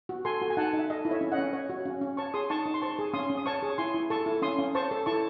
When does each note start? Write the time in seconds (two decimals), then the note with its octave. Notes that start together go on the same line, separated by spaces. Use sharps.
0.09 F#4
0.25 A4 G#5 C6
0.42 F#4
0.50 G#5
0.57 D#4 F#5 A5
0.73 D#4
0.79 E5
0.90 A4 D#5
1.05 E4
1.11 C#5 E5
1.21 C#4
1.32 D#5 F#5
1.38 C#4
1.53 C#5
1.70 F#4
1.86 C#4
2.01 C#4
2.17 C#5 A5 C#6
2.34 G#4 C6 D#6
2.50 D#4 A5 C#6
2.66 D#4
2.74 C6
2.82 C5 A5 C#6
2.99 G#4
3.14 C#4 C6 D#6
3.30 C#4
3.38 D#6
3.46 C#5 A5 C#6
3.63 G#4
3.70 C#6
3.78 E4 G#5 C6
3.94 E4
4.10 A4 A5 C#6
4.26 E4
4.42 C#4 C6 D#6
4.59 C#4
4.75 C5 A5 C#6
4.91 A4
5.06 E4 A5 C#6